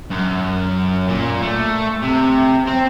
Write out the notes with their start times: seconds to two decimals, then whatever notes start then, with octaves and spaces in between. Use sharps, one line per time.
0.10 F#2
1.08 A#2
1.42 A3
2.02 C3
2.67 C4